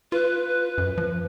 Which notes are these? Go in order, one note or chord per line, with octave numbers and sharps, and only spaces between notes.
F4 B4
F#2
F3